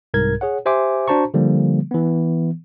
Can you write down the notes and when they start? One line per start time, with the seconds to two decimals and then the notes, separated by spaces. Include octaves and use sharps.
0.14 C2 G#2 A#4 G#6
0.41 G#4 C#5 F#5
0.66 G4 C5 E5 G#5 C6 D6
1.08 D4 F#4 C5 A5 A#5 C#6
1.34 D3 F3 G3 A#3
1.91 E3 B3